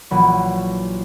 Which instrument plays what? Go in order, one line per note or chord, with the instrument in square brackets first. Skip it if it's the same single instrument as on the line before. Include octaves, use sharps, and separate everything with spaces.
[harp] A#1 E3 F#3 B5 C#6